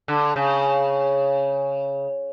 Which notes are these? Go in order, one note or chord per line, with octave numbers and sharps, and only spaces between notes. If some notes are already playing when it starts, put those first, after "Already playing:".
D3
C#3